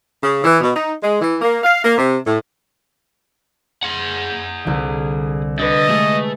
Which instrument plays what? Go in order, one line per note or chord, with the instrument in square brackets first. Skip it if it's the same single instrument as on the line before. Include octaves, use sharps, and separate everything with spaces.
[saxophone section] C#3
E3
B2
D#4
G#3
E3
A#3
F5
A#3
C3
A2
[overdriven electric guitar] G#4 F#5
[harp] C2 D3
[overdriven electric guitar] D3 [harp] G4 B4 [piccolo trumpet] D#5
[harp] G#3 G#4 [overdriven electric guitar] A3